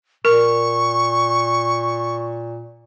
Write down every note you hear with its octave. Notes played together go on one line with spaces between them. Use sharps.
A#2 A#4 C#6